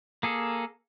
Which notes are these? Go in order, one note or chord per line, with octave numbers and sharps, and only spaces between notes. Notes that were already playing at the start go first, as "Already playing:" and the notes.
A#3 G#4 A4